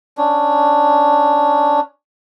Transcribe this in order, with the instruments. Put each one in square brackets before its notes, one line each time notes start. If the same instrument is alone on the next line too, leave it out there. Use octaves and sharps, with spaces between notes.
[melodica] C#4 D4